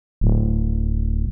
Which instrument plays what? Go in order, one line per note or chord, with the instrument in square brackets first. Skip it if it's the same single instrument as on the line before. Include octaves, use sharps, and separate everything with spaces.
[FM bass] D1